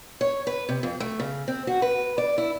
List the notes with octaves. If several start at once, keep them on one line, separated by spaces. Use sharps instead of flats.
C#5
B4
C3
F2
A3
C#3
C4
F#4
B4
D5
E4